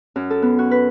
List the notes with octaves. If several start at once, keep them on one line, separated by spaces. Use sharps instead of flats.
F#2
A4
B3
F#4
B4